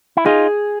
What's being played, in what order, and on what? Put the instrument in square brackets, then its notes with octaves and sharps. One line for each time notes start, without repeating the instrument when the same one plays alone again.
[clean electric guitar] E4
[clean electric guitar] D#4 F4 [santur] G#4